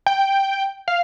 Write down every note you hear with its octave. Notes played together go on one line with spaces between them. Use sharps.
G5
F5